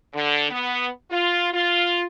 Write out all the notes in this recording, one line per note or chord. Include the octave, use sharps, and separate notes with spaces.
D3
B3
F4
F4